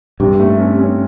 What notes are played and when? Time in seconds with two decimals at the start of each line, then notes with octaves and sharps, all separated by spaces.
0.20 G2 C3
0.40 A3
0.60 C#4
0.78 C#4